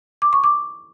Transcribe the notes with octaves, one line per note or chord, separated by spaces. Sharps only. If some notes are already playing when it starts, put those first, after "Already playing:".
D6
C#6
D6